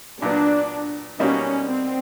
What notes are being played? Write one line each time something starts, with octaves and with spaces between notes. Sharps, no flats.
A#2 F#3 B3 D4
B2 G3 A#3 C#4 D#4 F#4
C4